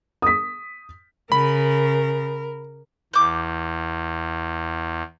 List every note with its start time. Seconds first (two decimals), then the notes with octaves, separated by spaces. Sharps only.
0.22 D#6 B6
1.32 C#3 A#4 B5
3.14 E2 D6 G6